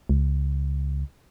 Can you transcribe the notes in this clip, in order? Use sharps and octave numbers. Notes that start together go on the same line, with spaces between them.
C#2